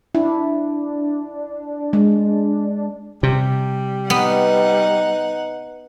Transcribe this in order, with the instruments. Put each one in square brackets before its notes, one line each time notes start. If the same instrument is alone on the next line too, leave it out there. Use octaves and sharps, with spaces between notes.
[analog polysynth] D4 [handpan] E4
[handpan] G#3
[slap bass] C3 [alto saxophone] G3
[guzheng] B3 [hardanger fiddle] D#4 F#5